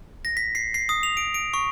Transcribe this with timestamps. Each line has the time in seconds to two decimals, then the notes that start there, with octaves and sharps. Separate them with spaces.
0.25 A#6
0.37 B6
0.55 C7
0.74 C7
0.89 D#6
1.03 F7
1.17 D7
1.34 D7
1.54 C#6